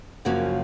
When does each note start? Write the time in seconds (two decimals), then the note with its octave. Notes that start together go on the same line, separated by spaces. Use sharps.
0.25 F#2 C#3 F3 A#3 F#4